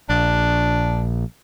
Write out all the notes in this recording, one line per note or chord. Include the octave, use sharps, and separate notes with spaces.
A#1 D4